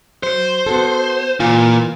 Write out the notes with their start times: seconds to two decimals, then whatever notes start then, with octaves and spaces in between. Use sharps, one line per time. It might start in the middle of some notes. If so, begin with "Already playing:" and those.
0.23 F#3 C5
0.66 B3 F#4 A4
1.40 A#2 E3 F4